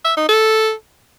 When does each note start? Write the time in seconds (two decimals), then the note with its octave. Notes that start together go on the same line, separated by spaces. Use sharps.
0.05 E5
0.17 D#4
0.29 A4